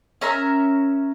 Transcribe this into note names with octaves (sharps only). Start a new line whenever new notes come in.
C#4 A#4 E5 A#5